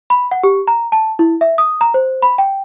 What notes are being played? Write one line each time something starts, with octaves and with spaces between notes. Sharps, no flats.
B5
F#5
G4
A#5
A5
E4
E5
D#6
A#5
C5
B5
G5